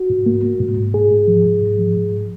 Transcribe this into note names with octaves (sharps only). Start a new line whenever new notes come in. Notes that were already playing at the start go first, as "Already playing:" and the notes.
Already playing: F#4
G#2
A#3
A#3
G#2
G#2
G#2 G#4
G#2
F3
G#2
G#2
F3
G#2